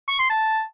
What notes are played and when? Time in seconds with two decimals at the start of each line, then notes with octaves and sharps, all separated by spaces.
0.08 C#6
0.19 C6
0.30 A5